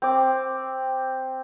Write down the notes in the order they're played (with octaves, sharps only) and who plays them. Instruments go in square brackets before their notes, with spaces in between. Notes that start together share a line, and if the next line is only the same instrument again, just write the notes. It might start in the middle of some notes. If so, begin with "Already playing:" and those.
[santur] C4 D6